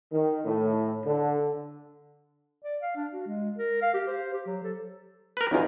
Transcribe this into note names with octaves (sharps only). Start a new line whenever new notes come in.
D#3
A2
D3
D5
F5
D4
F#4
G#3
A#4
F5
G4
C5
G4
F#3
A4
A#4 B4
B1 E2 C#4 D#4 F4